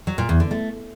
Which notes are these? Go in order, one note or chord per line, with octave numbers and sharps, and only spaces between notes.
F#3
A#2
E2
D3
A3